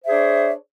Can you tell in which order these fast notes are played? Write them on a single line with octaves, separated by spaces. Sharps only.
C5 E5 G#4 D4 C#5